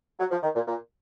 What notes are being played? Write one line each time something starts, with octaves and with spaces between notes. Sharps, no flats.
F#3
F3
D#3
A#2
A#2